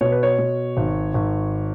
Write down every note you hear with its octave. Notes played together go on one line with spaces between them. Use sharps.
B2 C#5
B4
C#5
B2
G#1
G#1